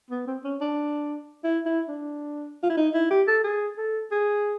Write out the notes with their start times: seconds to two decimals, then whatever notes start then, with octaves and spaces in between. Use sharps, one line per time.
0.11 B3
0.27 C4
0.44 C#4
0.61 D4
1.44 E4
1.66 E4
1.88 D4
2.63 F4
2.70 E4
2.77 D#4
2.94 E4
3.11 G4
3.28 A4
3.44 G#4
3.77 A4
4.11 G#4